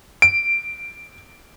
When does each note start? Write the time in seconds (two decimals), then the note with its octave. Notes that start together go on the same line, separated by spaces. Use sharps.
0.22 D7